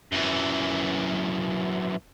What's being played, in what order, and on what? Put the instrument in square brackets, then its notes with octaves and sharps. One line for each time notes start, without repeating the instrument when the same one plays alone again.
[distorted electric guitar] F#2 E3